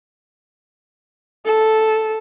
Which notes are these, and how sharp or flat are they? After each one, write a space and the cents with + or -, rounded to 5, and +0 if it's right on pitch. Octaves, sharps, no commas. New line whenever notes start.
A4 -5